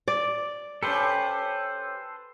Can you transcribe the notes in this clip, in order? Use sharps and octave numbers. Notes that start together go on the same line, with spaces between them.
D5
C#4 G4 A4 B4 C5